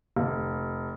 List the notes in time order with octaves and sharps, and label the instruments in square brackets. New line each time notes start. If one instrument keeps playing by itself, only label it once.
[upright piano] F1